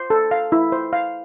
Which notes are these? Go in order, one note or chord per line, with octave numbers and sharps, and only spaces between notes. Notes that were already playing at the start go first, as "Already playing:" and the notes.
Already playing: C5
A4
F5
E4
C5
F5